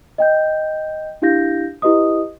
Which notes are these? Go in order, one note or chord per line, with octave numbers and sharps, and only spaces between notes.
D#5 G5 G6
D4 E4 G4 F5 G6 A#6
E4 G4 B4 D#5 D#6